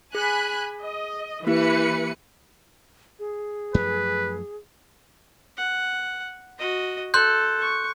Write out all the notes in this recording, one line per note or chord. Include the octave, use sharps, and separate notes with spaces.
G#4 G#5 B5 F#6
D#5
E3 A#3 E4 G4 B4 C#7
G#4
F#2 F3 A3 B4
F#5
F#4 D#5
A4 C6 F#6 G6
C#6